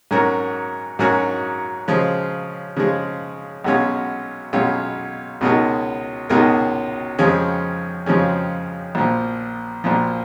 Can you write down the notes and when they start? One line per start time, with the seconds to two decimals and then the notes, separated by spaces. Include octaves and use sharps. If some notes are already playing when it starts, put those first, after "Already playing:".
0.11 G#2 F#3 C#4 F#4 A#4
0.99 G#2 F#3 C#4 F#4 A#4
1.88 C#3 F3 G#3
2.77 C#3 F3 G#3
3.64 B1 B2 G#3 C#4 F4
4.53 B1 B2 G#3 C#4 F4
5.41 C#2 B2 G#3 D#4 A#4
6.30 C#2 B2 G#3 D#4 A#4
7.19 F2 C#3 F3 G#3 C#4
8.06 F2 C#3 F3 G#3 C#4
8.95 A#1 A#2 F3
9.84 A#1 A#2 F3